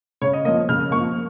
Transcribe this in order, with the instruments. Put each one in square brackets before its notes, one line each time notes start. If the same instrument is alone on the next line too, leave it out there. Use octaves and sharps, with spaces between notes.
[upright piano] C#3 C#5
D#5
A#3 D#5
F3
C#3 F6
A#3 C#6
F3